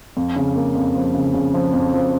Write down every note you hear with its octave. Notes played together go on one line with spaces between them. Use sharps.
F2
C#3
A#3
F2
F3
C#3
C#3
F3
F2
F3